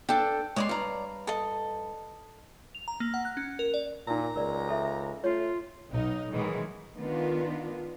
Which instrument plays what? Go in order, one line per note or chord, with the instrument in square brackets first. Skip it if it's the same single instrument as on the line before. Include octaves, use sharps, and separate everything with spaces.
[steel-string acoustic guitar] D4 A4 [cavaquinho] G5
[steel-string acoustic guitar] G#3 [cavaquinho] C#5 D5 C6
[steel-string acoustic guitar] G2 A#5
[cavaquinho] A4 D#5
[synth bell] F7
A#5
A#3
F#5
F#6
C#4
A#4
D5
[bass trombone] A#2 [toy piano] D#4 A#4 [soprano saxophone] A#5
[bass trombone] C#2 [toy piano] A#4 D5
[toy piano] A4 E5
[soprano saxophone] A3 [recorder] F4 [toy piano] C#5
[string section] B1 D#4
B2 D#3 E3 F#3 G#3
[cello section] D#3 B3 D4 F4